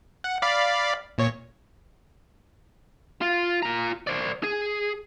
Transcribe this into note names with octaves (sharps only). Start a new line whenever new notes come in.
F#5
D5 F5 B5
A#2 C#5
F4
F4 A#5
C5 D5
G#4